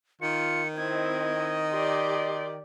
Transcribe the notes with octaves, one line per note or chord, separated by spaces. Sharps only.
D#3 F4 C#7
C4 E4 D#5 G#6
G4 D5 C6